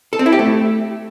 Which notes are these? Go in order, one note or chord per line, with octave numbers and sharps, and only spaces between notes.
A4
C4
E4
G4
A3